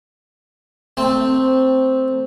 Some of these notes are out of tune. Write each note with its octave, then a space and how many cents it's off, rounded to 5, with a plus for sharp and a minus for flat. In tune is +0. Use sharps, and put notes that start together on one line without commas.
A3 +20 C4 +0